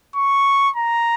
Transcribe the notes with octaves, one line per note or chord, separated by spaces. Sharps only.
C#6
A#5